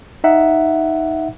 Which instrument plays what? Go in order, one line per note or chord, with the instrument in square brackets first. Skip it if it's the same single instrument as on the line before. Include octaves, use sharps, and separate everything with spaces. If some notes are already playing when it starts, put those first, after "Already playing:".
[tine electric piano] D#4 E5 F#5